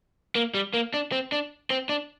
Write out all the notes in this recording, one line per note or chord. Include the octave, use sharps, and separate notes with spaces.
A#3
G3
A#3
D4
C4
D4
C4
D4